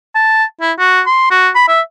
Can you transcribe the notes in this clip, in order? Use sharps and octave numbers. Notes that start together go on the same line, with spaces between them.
A5
E4
F#4
C6
F#4
B5
E5